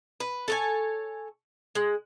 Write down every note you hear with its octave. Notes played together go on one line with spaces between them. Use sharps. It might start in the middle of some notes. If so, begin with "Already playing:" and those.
B4
A4 C#5 G#5
G#3